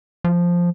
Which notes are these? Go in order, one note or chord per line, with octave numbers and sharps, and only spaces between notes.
F3